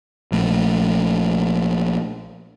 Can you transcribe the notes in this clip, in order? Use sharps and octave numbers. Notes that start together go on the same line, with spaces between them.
A#1 A3